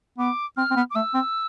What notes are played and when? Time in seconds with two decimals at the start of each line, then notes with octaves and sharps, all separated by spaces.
0.18 B3 D6
0.57 C4 F6
0.71 C4
0.76 B3
0.91 D6
0.95 A3 E6
1.14 C4